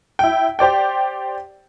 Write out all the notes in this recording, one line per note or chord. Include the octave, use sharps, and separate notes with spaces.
E4 G5
G4 C5 D5 G5